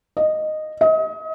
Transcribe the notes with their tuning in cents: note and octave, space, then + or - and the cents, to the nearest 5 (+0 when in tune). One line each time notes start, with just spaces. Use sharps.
D#5 -10
D#5 +35